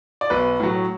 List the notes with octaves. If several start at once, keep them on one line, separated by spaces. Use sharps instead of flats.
D5
B1 B4
A2 F#3